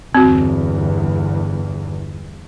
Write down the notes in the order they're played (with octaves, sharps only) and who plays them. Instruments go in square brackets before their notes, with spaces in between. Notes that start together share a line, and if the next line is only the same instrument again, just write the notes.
[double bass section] G1 E2 [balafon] C4 F#4